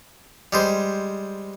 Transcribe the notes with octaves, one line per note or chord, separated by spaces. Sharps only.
G3 G#3 C5